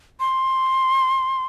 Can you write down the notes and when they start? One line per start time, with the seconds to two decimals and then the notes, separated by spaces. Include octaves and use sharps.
0.20 C6